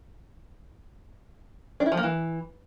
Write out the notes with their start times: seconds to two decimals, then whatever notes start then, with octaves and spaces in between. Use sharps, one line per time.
1.80 D4
1.86 E4
1.92 F3
1.97 A#3
2.03 E3